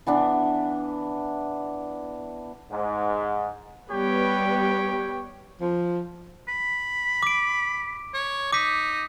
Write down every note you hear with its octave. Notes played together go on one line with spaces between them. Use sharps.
E3 B3 D4
G#2
G3 B3 G4 B4 C#5 G5
F3
B5
D6 D7
C#5
D#4 D6 B6